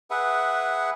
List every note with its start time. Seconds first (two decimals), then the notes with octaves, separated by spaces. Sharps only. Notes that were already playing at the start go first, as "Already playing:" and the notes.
0.11 G#4 B4 E5 F#5